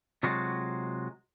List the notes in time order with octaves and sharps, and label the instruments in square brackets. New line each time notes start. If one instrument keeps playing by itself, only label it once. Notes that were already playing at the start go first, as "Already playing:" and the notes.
[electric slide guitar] C3 F#3 G#3 F4 F#4